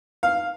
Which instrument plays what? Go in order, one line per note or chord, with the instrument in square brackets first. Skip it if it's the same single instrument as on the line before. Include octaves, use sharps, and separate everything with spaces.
[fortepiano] F5